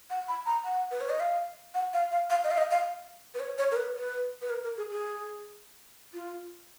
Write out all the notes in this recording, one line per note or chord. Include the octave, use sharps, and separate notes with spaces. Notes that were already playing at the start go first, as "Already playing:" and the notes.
F#5
B5
A#5
F#5
B4
C#5
D#5
F5
F#5
F5
F5
F5
D#5
F5
D#5
F5
B4
C#5
C#5
A#4
B4
B4
B4
A#4
A#4
G#4
G#4
F4